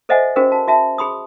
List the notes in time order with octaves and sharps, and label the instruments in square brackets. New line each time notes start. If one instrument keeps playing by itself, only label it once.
[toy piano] A4 C5 D#5 E5 F#5 G#5
C#4 F#4 G#4 A#4 C5
F#4 A5
F#4 E5 A5
G#4 B5 C6 D#6